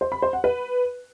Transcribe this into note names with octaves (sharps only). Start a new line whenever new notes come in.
C5
B5
C5
F#5
B4